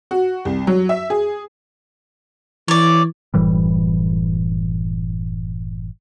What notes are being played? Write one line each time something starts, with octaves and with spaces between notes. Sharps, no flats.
F#4
C2
F#3
E5
G#4
E3 C#5 D5
F#1 A2 E3 G3